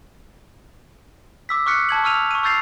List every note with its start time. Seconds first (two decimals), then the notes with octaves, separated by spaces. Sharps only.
1.49 D6 E6 B6
1.66 C#6 D6 F6 F#6 B6 C#7
1.89 A5 G#6 F#7
2.04 C#6 E6 F6 D#7 F7
2.31 C#6 D#7
2.43 C#6 E6 G6 A6 C7 F7